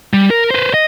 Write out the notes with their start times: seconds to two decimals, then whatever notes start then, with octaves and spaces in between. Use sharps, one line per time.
0.13 G3
0.30 A#4
0.51 B4 C5
0.74 D#5